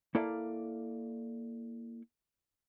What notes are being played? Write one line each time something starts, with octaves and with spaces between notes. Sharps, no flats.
A#3 E4 A4 D5 F5